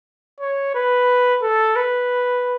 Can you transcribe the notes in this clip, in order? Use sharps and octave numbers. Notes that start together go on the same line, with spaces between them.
C#5
B4
A4
B4